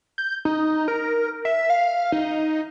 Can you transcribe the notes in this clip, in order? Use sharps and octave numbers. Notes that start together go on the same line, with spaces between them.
G6
D#4
A#4
E5
F5
D#4